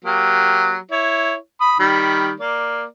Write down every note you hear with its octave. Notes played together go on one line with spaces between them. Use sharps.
F#3 A#3 G4
E4 C#5
B5 D#6
D#3 G3 B5
A#3 D5